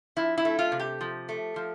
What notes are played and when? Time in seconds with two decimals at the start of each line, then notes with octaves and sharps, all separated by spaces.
0.16 F3 E4
0.38 E4
0.45 A3
0.59 F4
0.72 C3
0.79 G4
1.01 F3
1.29 A3
1.56 F3